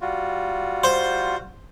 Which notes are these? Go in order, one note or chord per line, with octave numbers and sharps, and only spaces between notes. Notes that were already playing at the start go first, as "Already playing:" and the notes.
G3 F4 F#4
C5